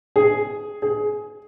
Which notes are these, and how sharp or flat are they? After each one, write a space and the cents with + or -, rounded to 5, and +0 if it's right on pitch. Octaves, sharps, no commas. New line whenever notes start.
G#4 +5
G#4 +15